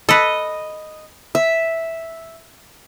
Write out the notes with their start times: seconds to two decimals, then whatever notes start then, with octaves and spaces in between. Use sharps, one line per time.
0.09 A4 B4 D#5
1.35 E5